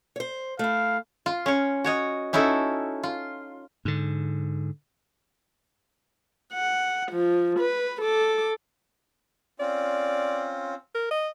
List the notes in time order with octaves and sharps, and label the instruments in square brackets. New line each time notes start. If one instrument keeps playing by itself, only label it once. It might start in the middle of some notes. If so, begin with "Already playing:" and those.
[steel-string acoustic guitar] C5 C#5
[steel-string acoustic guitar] A3 E4 [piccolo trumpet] F5
[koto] F4
C#4 C#5
F#4 C#5 D#5
C#4 D#4 E4 F#4 A4
F4
[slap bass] G#2 D3
[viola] F#5
F3
B4
A4 D6
[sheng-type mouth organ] C4 C#4 F4 [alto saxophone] D5
[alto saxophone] A#4
D#5